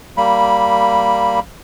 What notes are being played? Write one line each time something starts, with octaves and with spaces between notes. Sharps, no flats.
G3 A#3 B5